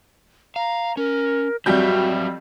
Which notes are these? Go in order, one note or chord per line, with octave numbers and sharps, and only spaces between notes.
F5 A#5
C#4 A#4
F2 F#3 G3 F#4 E5 G6